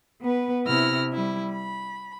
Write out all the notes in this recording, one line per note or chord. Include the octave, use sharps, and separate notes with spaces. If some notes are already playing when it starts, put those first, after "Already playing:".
B3 B4
C3 E4 F6 A#6
G3 E4
B5